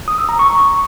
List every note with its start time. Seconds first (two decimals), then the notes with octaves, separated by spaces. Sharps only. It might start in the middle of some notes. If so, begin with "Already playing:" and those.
0.08 D#6
0.18 E6
0.29 A#5
0.39 C#6